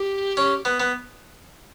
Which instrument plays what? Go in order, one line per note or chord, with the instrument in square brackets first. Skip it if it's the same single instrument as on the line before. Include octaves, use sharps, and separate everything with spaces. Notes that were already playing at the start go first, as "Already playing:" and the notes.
Already playing: [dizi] G4
[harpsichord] C#4
B3
B3